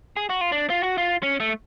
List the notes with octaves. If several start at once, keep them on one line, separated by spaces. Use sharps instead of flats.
G#4
F#4
F4
D4
F4
F#4
F4
C#4
A3